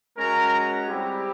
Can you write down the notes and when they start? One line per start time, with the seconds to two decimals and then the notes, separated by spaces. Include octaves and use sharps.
0.17 G#3 C#4 F#4 A#4 A#5
0.87 G3 C4 E4 G4